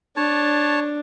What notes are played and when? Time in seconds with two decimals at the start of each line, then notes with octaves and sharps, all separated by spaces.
0.17 D4 C#5 A5